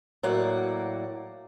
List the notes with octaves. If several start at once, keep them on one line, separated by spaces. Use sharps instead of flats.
A2 F#3 A#3 D5 F#5